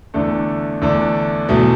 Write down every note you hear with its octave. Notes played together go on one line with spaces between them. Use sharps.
E2 D3 A3 D4
E2 D3 A3 D4
E2 B2 A3